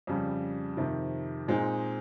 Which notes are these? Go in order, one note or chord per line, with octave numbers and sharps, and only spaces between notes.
F2 C#3 G3
F2 C3 D#3
A#2 G#3 C4 D#4